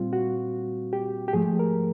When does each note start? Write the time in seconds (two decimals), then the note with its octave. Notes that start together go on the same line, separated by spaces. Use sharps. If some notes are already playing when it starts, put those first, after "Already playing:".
Already playing: A#2 G3 C4 F4
0.13 F#4
0.93 G4
1.28 G4
1.33 G#2 F3 A3 G#4
1.59 A#4